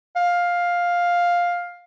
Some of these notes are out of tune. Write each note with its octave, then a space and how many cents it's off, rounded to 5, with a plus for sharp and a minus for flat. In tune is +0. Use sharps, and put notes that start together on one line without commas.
F5 +10